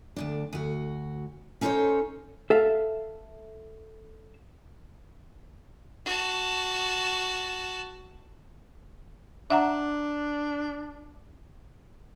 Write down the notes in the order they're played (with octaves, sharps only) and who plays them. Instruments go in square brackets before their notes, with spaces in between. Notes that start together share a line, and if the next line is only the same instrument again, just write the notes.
[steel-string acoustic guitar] D2 G2 D4
D2 F#4
C#4 D#4 A4 A#4 C5 C#5
[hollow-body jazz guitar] A4 E5 F5
[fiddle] F#4 A5
[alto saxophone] D4 [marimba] E5 F#5 A#5